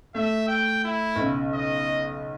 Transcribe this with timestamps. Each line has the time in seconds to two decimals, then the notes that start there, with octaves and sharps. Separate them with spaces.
0.15 A3 E5
0.48 G5
0.84 E4
1.15 B1 C#3
1.54 D#5